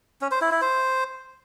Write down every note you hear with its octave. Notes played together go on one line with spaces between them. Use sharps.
C#4
C5
E4
E4
C5